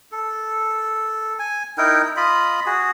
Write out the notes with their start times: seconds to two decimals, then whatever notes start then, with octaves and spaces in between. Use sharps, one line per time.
0.12 A4
1.39 G#5
1.78 D#4 E4 A#4 G5
2.16 F4 D#5 B5
2.66 F#4 G#4